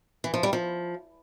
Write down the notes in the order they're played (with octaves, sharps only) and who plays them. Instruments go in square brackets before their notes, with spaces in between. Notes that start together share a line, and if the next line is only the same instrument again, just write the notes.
[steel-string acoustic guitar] E3
F3
G3
F3